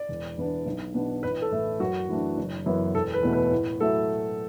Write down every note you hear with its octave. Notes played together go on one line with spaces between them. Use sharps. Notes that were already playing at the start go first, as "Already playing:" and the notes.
Already playing: D5
E1
E2 E3 B3 D4
B1
B2 B3 D4
A1 B4
A4
A2 E3 A3 E4
F#2 F#4
E3 A3 D4
F#1
F#2 E3 B3 E4
E1 A4
B4
E2 B2 A3
B4
A2
F#3 A3 E4 A4